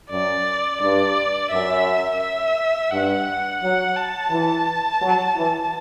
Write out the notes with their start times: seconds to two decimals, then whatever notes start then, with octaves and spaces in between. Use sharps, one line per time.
0.10 F#2 D5
0.80 G2 D5
1.51 F#2 E5
2.20 E5
2.91 G2 F#5
3.61 F#3 F#5
3.96 A5
4.30 E3
5.01 F#3
5.36 E3